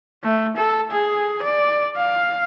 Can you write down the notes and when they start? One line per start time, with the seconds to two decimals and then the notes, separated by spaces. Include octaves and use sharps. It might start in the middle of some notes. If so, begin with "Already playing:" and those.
0.24 A3
0.57 A4
0.91 G#4
1.42 D5
1.97 F5